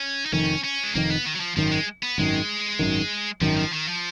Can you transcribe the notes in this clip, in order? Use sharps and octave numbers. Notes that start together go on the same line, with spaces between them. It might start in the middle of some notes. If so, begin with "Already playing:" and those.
Already playing: C#4
D#4
F1 F2 D#3 C#4
C#4
G#3
F1 F2 D#3 A#3
B3
D#3
F#3
F3
G#1 F#2 D#3 F3
G#3
B3
G#1 F#2 D#3 G#3
G#1 F#2 D#3
G#1 F#2 D#3 F3
F3
D#3
F3